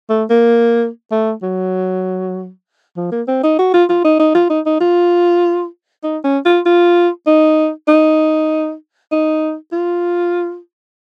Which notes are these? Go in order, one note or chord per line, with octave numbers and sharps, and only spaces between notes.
A3
A#3
A3
F#3
F3
A#3
C4
D#4
F#4
F4
F4
D#4
D#4
F4
D#4
D#4
F4
D#4
C#4
F4
F4
D#4
D#4
D#4
F4